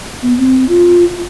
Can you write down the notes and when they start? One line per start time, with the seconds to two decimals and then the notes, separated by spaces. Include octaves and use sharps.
0.22 B3
0.38 C4
0.69 F4